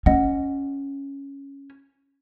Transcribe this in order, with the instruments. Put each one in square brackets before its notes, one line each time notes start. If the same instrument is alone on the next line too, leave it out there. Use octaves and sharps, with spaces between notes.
[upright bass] C#4 [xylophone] D#5 F#5